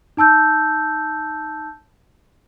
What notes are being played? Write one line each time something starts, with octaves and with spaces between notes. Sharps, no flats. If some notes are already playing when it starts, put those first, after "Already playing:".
D#4 A5 E6 G6